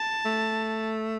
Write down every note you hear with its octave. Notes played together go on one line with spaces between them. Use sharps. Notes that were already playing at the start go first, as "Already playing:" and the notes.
Already playing: A5
A3